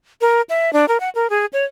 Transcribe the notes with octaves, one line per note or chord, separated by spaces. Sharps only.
A#4
E5
D4
A#4
F#5
A#4
G#4
C#5